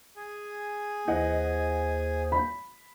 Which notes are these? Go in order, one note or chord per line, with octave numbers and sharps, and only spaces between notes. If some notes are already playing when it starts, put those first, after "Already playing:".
G#4 G#5
D#2 E3 C5 D#5 F#5
B5